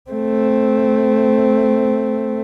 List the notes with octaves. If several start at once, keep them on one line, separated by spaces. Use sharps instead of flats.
A3 C4